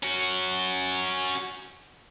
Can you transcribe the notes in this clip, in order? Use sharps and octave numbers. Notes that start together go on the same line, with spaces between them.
C#4 F#4